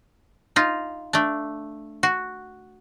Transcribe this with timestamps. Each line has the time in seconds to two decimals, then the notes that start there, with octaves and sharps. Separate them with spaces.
0.56 D#4 F4
1.13 A3 D4
2.03 F#4